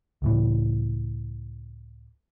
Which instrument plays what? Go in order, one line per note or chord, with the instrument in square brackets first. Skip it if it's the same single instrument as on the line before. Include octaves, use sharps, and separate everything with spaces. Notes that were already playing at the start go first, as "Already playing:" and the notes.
[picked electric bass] C#2 A2 E3